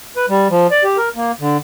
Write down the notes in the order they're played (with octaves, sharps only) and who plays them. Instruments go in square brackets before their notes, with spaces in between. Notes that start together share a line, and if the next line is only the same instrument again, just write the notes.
[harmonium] B4
G3
F3
D5
G4
A#4
A#3
D3